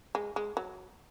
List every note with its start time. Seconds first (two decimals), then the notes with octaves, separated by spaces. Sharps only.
0.15 G#3
0.36 G#3
0.57 F#3